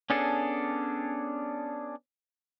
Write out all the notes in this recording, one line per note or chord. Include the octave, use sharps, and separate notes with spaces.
B3 C#4 D4 G#4 A4